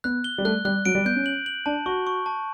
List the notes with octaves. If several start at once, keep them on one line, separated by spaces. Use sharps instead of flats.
B3 F#6
G7
G3
A3 F#6
G3 F#6
F#3 D7
G3
B3 G6
C#4
F#7
F#7
D4 A5
F#4 C#6
C#6
A5